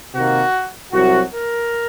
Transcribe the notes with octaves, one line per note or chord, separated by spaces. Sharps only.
C3 D#3 A#3 F#4
C2 C3 F#3 F#4
A#4